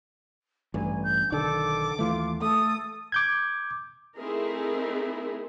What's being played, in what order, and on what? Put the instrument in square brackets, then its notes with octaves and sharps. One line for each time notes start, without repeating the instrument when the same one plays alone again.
[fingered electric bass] A1 G2 [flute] G#5
[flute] G6
[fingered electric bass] B1 D3 D#3 [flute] A4 [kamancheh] D6
[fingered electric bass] D#2 E3 A3 [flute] F4
[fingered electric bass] A3 [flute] A4 [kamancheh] D#6
[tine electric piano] D6 G6 G#6
[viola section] A3 C4 D#4 E4 G#4 A#4